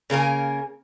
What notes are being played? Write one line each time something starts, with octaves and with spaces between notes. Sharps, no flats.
C#3 A#3 A#4 G#5